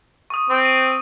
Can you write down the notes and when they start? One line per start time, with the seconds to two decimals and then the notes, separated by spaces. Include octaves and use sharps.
0.30 C#6 D#6
0.50 C4
0.65 D#7